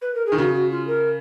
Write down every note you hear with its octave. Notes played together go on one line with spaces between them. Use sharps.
B4
A#4
G#4
D#3
C#3 F#4
F#4
F4
A#4